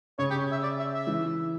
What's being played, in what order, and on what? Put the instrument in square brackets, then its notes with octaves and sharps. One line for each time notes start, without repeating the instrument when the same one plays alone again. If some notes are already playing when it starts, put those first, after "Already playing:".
[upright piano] C#3 [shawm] C#5
[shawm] G4
E5
D5
E5
E5
[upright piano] E3